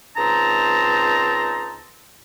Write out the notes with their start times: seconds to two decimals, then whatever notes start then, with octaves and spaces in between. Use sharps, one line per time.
0.17 C#2 C4 D#4 A5 A#5